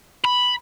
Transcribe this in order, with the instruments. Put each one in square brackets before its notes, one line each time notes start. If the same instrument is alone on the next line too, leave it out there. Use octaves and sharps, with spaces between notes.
[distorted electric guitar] B5